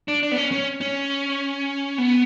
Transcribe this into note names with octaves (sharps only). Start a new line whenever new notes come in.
D4
D4
B3
C#4
C#4
C#4
B3